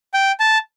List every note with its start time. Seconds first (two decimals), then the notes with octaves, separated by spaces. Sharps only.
0.14 G5
0.40 A5